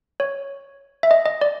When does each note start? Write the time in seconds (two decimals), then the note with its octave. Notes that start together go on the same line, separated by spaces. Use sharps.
0.20 C#5
1.03 E5
1.11 D#5
1.26 D#5
1.41 D5